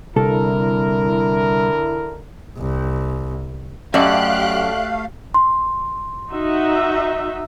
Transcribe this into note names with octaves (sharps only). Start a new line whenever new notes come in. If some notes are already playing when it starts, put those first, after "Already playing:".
C2 D3 E4 A4 A#4
C2
F#2 A3 G4 A4 D5 D#5 F5 F#6
C6
D#4 F#4 E5